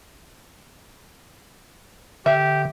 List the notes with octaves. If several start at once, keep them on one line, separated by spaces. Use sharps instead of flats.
D3 G4 E5